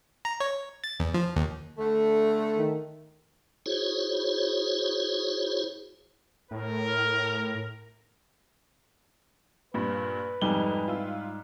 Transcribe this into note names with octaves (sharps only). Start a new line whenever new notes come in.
A#5
C#5
A6
E2
F3
D#2
D3 A3 A4
D#3
E4 F#4 G#4 C5 C#5
A2 A#4
G2 A#2 B4
F2 G#2 G3 G#5 G7
E4 F4